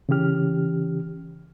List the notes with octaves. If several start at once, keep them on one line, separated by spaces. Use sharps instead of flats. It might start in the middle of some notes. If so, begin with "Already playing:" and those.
C#3 E3 C#4 G4 F6